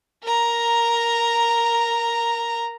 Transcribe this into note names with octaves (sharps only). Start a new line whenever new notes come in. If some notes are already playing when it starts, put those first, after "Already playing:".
A#4 A#5